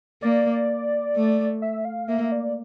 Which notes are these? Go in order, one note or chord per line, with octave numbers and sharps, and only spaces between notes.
A#3 D5
A3
E5
F5
A#3 E5
D5